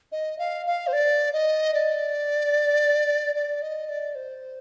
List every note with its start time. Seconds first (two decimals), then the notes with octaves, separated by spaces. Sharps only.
0.12 D#5
0.39 F5
0.66 F5
0.87 C5
0.93 D5
1.33 D#5
1.74 D5
3.35 D5
3.62 D#5
3.89 D5
4.15 C5